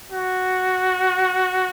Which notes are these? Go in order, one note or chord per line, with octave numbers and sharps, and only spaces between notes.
F#4